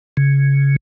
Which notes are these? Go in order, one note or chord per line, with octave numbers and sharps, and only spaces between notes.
C#3